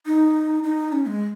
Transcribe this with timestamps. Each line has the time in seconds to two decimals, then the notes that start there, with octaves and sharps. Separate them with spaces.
0.06 D#4
0.63 D#4
0.92 C#4
1.06 G#3